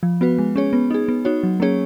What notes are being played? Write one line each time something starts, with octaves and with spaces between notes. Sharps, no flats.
F3
B3 F#4 B4
G#3
C#4 G#4 C#5
B3
D#4 G#4
B3
D#4 F#4 C#5
F#3
A#3 C#4 G#4 C#5